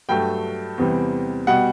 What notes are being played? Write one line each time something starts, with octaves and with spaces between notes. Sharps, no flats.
G2 F#3 A3 G5
E2 C3 E3 G3
B2 G3 F#5